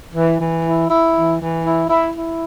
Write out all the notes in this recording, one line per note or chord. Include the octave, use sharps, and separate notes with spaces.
E3
E3
E4
E4
E3
E3
E4
E4
E4